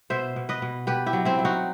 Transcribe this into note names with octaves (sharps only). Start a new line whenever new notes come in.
B2 C5 E5
B2
B4 D#5
B2
B2 G4 B4
E4 G4
F#3
C4 E4
F#3
D#4 F#4